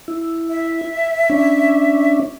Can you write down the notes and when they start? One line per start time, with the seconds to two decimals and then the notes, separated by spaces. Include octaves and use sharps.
0.08 E4
0.50 E5
1.30 C#4 D4